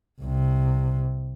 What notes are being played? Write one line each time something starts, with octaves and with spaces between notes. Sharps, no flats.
C2 C3